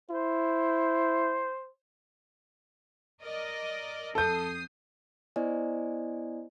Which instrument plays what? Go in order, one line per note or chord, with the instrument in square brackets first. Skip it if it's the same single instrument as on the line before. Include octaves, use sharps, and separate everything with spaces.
[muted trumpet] E4 [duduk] C5
[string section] A#4 D5 D#5
[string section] F2 D#6 C7 [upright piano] A4 G6
[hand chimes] B3 E4 C5 D5 D#5 G#5